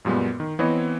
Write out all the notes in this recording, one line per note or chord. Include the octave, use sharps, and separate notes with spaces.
F#2 A#2 G3 G#3 B3
D#3
E3 B3 C4 E4 C#5 D#5